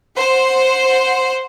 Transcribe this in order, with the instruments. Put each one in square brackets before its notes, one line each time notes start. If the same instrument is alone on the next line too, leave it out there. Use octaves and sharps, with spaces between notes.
[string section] C5 F#5